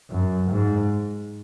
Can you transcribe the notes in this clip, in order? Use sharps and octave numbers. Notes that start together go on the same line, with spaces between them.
F#2
G#2